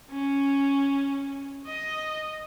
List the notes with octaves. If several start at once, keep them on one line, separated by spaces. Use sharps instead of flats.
C#4
D#5